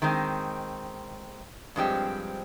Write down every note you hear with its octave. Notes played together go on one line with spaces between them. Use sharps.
D#3 G#3 C4
G2 F3 G#3 C4 G4